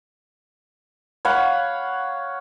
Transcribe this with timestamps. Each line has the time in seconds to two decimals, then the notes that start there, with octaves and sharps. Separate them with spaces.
1.25 C#5 F5 F#5 B5